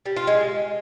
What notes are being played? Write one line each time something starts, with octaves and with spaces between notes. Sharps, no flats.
G3
F4
G#3